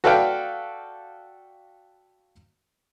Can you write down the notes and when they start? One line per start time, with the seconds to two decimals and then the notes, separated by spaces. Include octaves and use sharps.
0.04 F#4 A4 B4 D5 F5 G5